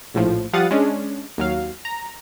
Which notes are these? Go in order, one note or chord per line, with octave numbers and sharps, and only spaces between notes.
A#1 A2 F3
F3 G3 F5 F#5 D#6 A6
G#3 C#4 D4
D#2 F#3 F5
A#5